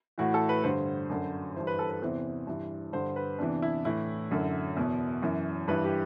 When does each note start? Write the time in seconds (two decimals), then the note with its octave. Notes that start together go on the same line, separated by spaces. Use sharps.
0.18 A2 E3 F#4
0.34 A4
0.49 B4
0.64 G2 D3 C5
1.09 F#2 D3
1.56 G2 E3 C5
1.67 B4
1.79 A4
1.90 B4
2.02 E2 C3 E3 C5
2.47 G2 E3
2.93 G2 D3 C5
3.16 B4
3.39 E2 C3 E3 D4
3.62 E4
3.85 A2 E3 E4
4.31 F#2 D3
4.76 E2 B2
5.22 F#2 E3
5.68 G2 E3 B4
5.84 G4